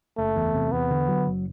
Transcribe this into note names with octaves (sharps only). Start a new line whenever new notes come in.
F#1 A3
E2
C3
E2 B3
D3
F#3
F#1